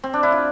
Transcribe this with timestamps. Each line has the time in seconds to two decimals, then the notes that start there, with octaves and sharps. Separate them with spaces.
0.04 C4
0.13 D4
0.23 E4
0.32 F4